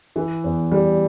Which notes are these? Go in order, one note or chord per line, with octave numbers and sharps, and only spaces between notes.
E3
E2
G3